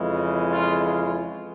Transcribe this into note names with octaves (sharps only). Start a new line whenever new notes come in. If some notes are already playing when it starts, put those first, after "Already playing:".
Already playing: F2 C#3 E3 G#3
F4